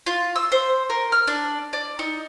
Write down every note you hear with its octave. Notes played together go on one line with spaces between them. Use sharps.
F4
E6
C5
A#4
F6
D4
D5
D#4